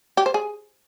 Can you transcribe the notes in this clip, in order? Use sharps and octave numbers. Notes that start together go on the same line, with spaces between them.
G4
C5
G#4